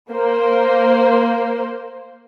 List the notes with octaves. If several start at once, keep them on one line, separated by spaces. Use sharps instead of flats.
A#3 C5